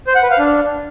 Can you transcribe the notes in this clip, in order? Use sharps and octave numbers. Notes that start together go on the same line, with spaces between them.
C5
F#5
B4
F5
D4